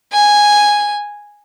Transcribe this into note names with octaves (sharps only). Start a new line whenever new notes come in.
G#5